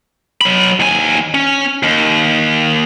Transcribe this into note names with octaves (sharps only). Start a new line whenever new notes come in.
F#3 B5
D#2 G#5
C#4
D#2